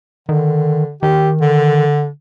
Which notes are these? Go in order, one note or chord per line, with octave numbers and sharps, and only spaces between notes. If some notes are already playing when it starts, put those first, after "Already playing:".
D3 D#3
D#3 G4
D3